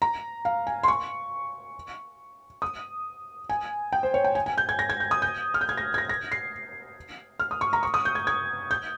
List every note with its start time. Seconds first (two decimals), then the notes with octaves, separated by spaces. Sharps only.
0.02 A#5
0.45 F5
0.67 G#5
0.83 C6
0.88 C#6
2.62 D#6
3.49 G#5
3.93 G5
4.03 C5
4.14 C#5
4.24 G5
4.35 G#5
4.46 G#5
4.58 G6
4.69 G#6
4.79 A#6
4.90 G#6
5.00 G6
5.11 D#6
5.22 G6
5.54 F6
5.61 G6
5.69 G#6
5.77 A#6
5.94 G#6
5.98 A#6
6.09 A#6
6.32 C7
7.40 F6
7.51 D#6
7.61 C#6
7.73 A#5
7.83 C#6
7.94 D#6
8.05 G6
8.15 G#6
8.27 G#6
8.71 G6